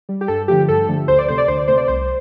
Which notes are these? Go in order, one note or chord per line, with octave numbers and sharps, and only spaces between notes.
G3
G4
G2 A4
D3 F3 A3 G4
G2 A4
D3 F3 A3
D2 C5
D5
C3 A3 C5
D5
D2 C5
D5
C3 A3 C5
D5
C2 C5